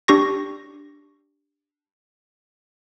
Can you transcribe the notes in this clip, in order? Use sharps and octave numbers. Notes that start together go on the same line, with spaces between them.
D4 G4 C#6 A#6